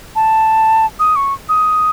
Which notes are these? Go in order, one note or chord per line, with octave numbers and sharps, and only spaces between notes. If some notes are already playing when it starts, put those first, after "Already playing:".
A5
D#6
C#6
D#6